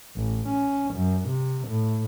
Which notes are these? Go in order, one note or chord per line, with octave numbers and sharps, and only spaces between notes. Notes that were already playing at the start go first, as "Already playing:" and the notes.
A1
C#4
F#2
C3
A2